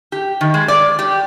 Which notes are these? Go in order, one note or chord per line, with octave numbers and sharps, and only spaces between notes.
G4
D#3
G#3
D5
G4